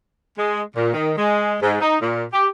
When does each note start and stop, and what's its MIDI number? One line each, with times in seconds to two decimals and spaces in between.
0.38 0.61 56
0.76 0.92 46
0.93 1.12 51
1.17 1.56 56
1.61 1.77 44
1.81 1.96 63
2.01 2.24 46
2.33 2.47 67